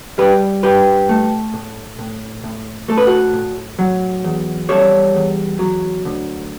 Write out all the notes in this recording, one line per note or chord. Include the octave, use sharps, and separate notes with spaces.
G3 G4 B4
G2 G4 B4
A3
A2
A2
A2
A3 A4
B4
F#4 A4
A2
F#3
E2
G3 A4 C#5
E2
F#3
D2